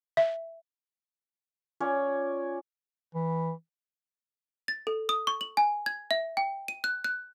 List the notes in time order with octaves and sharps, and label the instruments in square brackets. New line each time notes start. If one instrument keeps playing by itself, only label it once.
[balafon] E5
[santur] C#4 F4 C#5 D5
[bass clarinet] E3
[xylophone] A6
A4
D#6
C#6
F#7
G#5
G#6
E5
G5
D#7
F#6
F#6